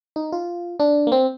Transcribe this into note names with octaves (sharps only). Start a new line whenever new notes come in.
D#4
F4
D4
A#3
C4